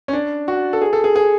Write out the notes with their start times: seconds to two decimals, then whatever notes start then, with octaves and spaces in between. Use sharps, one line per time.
0.08 C#4
0.13 D4
0.48 F#4
0.73 A4
0.82 G#4
0.93 A4
1.04 G#4
1.16 G#4